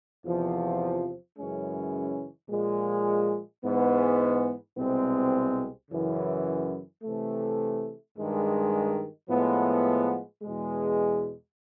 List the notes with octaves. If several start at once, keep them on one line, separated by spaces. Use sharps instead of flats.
E2 C3 F3
F#2 C#3 E3 G#3 C#4
A#2 F3 G#3
G#2 E3 G#3 B3
C2 B2 G#3 C4
F#2 C#3 E3
C3 E3 A3
G2 D#3 G#3
A2 F3 G#3 B3
E2 B2 G#3